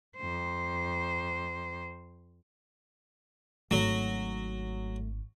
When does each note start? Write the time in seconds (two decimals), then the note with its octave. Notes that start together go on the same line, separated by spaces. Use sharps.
0.17 F2 C5
3.71 G#1 F#3 A3